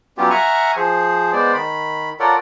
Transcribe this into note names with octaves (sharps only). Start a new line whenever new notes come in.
F#3 G3 B3 C#4 F4 G4
E5 F#5 G#5 A#5 C#6 F6
F3 G#4 C5
G#3 B3 C5 D5
D#3 B5
F4 A4 A#4 C#5 D5 F#5